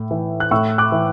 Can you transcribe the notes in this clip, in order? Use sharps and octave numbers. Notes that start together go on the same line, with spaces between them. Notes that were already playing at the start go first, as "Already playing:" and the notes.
Already playing: A2
E3
F#6
A2 C#6 E6
D6 F#6
E3